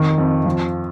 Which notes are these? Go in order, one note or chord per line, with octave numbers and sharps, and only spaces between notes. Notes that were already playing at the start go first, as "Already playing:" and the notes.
Already playing: F2 D#3
F2
F3